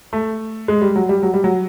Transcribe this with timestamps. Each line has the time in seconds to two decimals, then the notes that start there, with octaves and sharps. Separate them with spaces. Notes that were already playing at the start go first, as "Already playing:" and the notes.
0.13 A3
0.68 G#3
0.82 G3
0.96 F#3
1.09 G3
1.23 F#3
1.34 G3
1.44 F#3